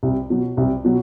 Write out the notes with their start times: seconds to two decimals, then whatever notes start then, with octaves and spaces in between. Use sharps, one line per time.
0.03 C2
0.30 B2 F#3
0.57 C2
0.85 B2 F#3